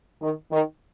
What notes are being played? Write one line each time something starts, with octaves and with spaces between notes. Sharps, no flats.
D#3
D#3